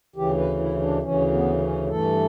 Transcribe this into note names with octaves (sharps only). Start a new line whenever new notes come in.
D2 C#3 E3 G4
B4
E4
D4
D2 C#3 E3 C#4
B3
C#4
G2 E3 A3 A4